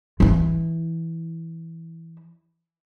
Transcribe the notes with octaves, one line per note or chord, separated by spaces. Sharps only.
E3 E4